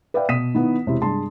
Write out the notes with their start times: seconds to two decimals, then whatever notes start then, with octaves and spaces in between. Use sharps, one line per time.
0.14 B4 D5 E5 F5 G5
0.29 B2 D#6 B6 D#7 E7
0.55 D#3 B3 E4
0.86 E1 C3 E4
1.02 G2 G#3 A5 C6